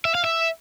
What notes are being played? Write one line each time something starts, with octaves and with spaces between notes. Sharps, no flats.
E5
F5
E5